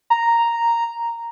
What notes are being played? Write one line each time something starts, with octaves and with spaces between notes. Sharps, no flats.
A#5